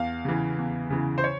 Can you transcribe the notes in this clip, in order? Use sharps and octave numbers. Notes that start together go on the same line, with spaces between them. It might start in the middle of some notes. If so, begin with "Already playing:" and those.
Already playing: E2 F5
C#3 E3
E2
C#3 E3
C5
C#5